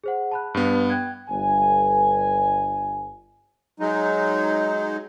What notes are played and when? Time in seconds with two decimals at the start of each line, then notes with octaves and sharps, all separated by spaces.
0.04 G#4 C5 F#5
0.32 A5 B5 F#6
0.54 G2 B3
0.90 G5 F#6 G#6
1.29 G1 G#5
3.80 F#3 G#3 D#4